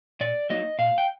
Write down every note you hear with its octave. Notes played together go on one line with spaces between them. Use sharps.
A#2 D5
F#3 A#3 D#4 D#5
A#2 F5
G5